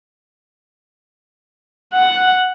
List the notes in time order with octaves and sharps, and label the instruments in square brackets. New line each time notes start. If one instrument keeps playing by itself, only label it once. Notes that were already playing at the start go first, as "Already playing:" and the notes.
[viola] F#5